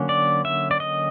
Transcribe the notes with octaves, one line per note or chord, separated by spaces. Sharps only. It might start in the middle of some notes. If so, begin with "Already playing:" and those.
Already playing: D3 F#3 A#3 C#4
D5
E5
D5
D#5